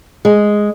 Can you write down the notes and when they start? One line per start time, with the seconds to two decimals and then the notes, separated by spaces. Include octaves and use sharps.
0.25 G#3